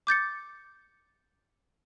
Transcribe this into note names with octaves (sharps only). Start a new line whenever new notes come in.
D6 G6 A6 C#7